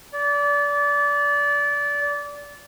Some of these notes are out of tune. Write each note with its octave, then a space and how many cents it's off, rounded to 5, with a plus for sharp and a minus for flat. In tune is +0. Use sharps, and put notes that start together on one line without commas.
D5 -25